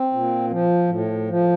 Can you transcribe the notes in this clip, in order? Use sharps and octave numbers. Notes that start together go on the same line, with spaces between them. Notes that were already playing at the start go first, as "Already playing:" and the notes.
Already playing: C4
A#2
F3
A2
F3